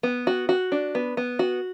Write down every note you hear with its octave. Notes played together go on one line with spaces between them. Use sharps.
B3
F#4
F#4
D4
B3
B3
F#4